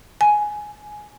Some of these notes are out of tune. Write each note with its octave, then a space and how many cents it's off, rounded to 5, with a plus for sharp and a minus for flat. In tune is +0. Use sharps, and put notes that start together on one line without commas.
G#5 +10